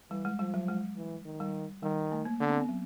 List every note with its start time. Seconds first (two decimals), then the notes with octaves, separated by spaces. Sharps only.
0.11 E3 G3
0.25 G#3
0.39 F3 G3
0.54 F#3
0.68 G#3
0.97 E3
1.25 D#3
1.40 G3
1.83 D#3 G3
2.12 A3
2.25 A#3
2.40 D3 B3
2.50 C4
2.60 B3
2.69 F#3